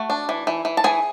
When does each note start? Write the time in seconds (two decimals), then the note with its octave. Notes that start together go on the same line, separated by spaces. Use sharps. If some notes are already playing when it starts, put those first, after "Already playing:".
Already playing: A3 F#4
0.10 D4
0.29 E3
0.47 E3
0.65 E3
0.77 A5
0.84 E3 G#4 G#5